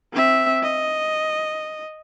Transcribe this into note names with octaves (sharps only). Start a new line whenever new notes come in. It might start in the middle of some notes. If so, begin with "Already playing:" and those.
C4 E5
D#5